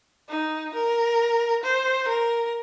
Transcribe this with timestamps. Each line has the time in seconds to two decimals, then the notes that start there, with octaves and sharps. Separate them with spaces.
0.29 D#4
0.74 A#4
1.64 C5
2.08 A#4